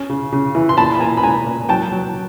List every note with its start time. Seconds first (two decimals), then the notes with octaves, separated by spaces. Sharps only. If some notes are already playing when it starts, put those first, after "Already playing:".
Already playing: C#4
0.10 C#3
0.32 C#3
0.55 E3
0.69 C6
0.77 A#2 A5 B5
0.95 B5
1.00 A#2 G#5 A#5
1.17 B5
1.23 G#3 G#5 A#5
1.46 A#2
1.69 F#3 G5 A5
1.92 F#3